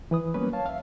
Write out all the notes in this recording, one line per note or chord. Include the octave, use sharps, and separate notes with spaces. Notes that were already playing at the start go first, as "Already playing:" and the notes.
E3 B4 D#6
F#3 G3 A#3 B3 C#4 B4
C#5 F5 A5
E5 F5